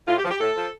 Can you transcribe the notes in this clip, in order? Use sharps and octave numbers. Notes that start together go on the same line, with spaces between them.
A2 F4
G4
F3
G4
A2 A4
F3